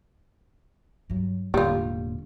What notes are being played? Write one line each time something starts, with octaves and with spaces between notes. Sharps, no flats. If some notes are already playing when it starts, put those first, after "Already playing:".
G2 F#3
E1 A2 D3 G3 A#3 F4